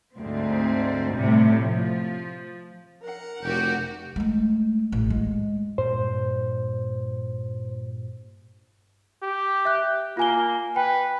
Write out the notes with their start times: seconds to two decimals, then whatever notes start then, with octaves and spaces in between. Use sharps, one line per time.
0.18 D2 G#2 C4
1.16 A2 C3 G3
1.62 F3
3.01 A#4 F#5
3.43 F1 F#4 G4 G6
4.16 G#3 A3
4.92 A1
5.10 G#3
5.78 G2 A#2 C5
9.23 G4
9.65 E5 F#6
10.17 A#3 F4 G#5 G7
10.76 B4 G5